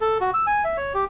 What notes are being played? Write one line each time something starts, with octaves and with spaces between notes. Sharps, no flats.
A4
F#4
E6
G#5
E5
C#5
G4